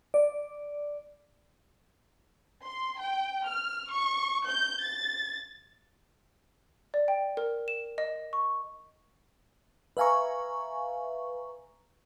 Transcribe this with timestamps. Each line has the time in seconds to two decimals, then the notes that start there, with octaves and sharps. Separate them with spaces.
0.14 D5
2.64 C6
2.99 G5
3.46 F6
3.90 C#6
4.46 G6
4.82 A6
6.94 D5
7.08 G5
7.37 A#4
7.68 E7
7.98 D#5
8.33 C#6
9.97 B4 E5 F5 G#5 A#5 C#6